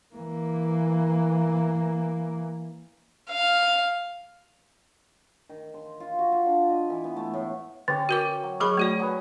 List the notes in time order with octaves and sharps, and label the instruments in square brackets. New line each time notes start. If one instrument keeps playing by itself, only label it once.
[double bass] E3 A#3
[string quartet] F5
[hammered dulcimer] D#3
C6
F4
F#4
F4
D4
D#5
E3
B3
A3
A2
[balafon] D3 [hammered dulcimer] C#4 G4
[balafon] F#4 A#4 D6
[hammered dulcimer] F#3
[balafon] F#3 G#4 B5 [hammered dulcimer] C#5 C#6
[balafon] A3 F#4 D5
[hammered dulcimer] F#3 G#4 B4